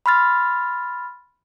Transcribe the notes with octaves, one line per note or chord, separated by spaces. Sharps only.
B5 C6 F6 A6